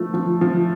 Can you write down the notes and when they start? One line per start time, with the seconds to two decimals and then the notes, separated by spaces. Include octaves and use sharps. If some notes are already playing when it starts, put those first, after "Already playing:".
Already playing: F3 A3
0.14 F3
0.41 F3